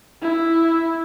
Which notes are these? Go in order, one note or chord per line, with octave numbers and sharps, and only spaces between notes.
E4